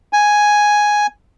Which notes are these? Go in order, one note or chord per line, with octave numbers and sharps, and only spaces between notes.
G#5